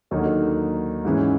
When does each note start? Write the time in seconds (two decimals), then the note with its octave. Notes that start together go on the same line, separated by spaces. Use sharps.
0.11 D#2 D3 F#3 A#3 D#4
1.05 G#2 E3 G#3 C#4